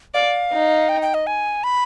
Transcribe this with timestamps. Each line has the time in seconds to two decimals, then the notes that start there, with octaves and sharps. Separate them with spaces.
0.14 D5 F5
0.52 D#4
0.89 G5
1.02 G5
1.14 D#5
1.27 G#5
1.64 B5